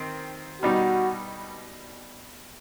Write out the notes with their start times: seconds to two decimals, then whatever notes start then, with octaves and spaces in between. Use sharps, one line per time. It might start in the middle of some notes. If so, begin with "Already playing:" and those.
Already playing: D#3 C4
0.62 B2 G3 D#4 F#4